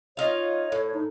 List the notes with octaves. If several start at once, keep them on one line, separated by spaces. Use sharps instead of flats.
D#4 F4 C#5 F5
A2
D#4